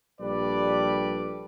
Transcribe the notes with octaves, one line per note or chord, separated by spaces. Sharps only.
A#1 G3 A4 B4 D5